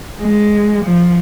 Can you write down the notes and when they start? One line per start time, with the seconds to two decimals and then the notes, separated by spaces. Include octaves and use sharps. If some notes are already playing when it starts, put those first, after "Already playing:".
0.21 G#3
0.84 F3